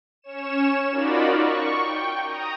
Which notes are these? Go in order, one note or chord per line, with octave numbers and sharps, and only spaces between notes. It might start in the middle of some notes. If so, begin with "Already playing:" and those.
C#4 C#5 E7
D#4 F4 F#4 A#4 D5 B5
C#6
G5
A#5 D#6